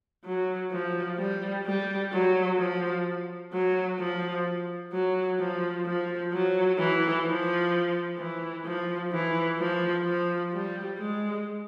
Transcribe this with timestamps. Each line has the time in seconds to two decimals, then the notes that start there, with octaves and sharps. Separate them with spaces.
0.25 F#3
0.72 F3
1.19 G3
1.66 G3
2.12 F#3
2.58 F3
3.52 F#3
3.99 F3
4.93 F#3
5.39 F3
5.86 F3
6.32 F#3
6.79 E3
7.25 F3
8.18 E3
8.65 F3
9.12 E3
9.58 F3
10.05 F3
10.53 G3
10.99 G#3